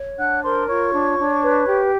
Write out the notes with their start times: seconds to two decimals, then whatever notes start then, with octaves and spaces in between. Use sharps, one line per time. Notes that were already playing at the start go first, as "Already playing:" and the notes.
Already playing: C#5
0.18 D4 F#5 F#6
0.43 A#4 C5 C6
0.68 F4 C#5 C#6
0.93 D4
1.18 D4
1.43 B4
1.68 G4